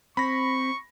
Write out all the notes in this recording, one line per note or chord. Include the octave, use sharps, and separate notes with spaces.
C4 B5 C#6 A#6